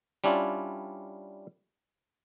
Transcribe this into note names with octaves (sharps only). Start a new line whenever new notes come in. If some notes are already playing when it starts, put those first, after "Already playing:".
G3 C#4 D4 E4 F4